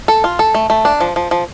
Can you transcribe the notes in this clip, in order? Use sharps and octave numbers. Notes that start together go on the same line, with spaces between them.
A4
F4
A4
A3
A3
D4
F3
F3
F3